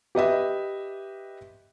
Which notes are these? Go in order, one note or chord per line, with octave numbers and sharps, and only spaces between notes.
G4 B4 D#5 E5